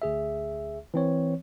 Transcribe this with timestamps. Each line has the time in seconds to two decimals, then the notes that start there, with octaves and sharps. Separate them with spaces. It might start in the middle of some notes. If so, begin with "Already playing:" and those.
0.02 D2 G#4 E5
0.94 E3 C4 C#5